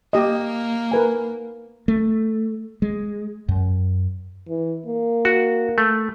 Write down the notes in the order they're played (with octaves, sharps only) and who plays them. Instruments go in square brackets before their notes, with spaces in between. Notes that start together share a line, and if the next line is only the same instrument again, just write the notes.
[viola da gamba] A#3 [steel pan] G4 D#5
[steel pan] A#4 B4 G#5
[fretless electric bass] A3
G#3
F#2
[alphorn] E3
A#3
[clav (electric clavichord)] F#4
A3